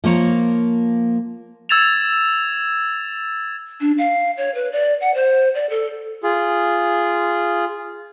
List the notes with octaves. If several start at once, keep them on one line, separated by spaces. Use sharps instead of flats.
F3 A#3 C5 C#5
E6 G#6 A6 E7 F7
D4
F5
C#5
B4
D5
F#5
C5
D5
A4
F4 G#4